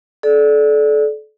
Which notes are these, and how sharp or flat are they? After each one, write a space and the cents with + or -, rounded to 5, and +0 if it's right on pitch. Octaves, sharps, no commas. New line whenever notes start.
A4 -30 D5 +0